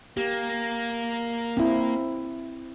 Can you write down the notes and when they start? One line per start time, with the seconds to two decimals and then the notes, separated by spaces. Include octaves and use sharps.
0.17 A#3 G4
1.57 C4 E4